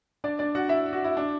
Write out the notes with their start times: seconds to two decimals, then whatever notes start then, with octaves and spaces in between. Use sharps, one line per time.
0.24 D4 D5
0.39 D4 D5
0.55 F#4 F#5
0.69 E4 E5
0.93 F#4
1.04 E4
1.17 D4